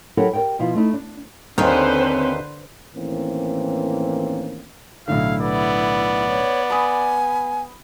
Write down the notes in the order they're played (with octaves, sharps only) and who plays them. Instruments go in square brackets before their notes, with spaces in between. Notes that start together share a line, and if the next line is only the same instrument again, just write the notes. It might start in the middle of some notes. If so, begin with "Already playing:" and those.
[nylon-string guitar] F#3 E4 G4 A4 A#4 F#5
G4 A#4 C#5 D5 G5
B2 F3 E4 F4
A3 D#4 E4
D4
[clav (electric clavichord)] D#2 D#3 [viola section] D3 B4 C5 [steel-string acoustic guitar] C4 C#4
[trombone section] A2 D#3 E3 A#3 C4 C#4
[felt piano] B1 A2 D3 [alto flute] E4 [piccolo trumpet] F5
[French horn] B3 [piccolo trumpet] D5
[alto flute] C#5
[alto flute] G#5 [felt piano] B5 D#6